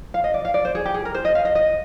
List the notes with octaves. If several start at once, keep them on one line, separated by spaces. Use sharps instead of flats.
F5
D#5
D5
F5
D5
C5
G#4
G4
G#4
A#4
C5
D#5
F5
D#5
D#5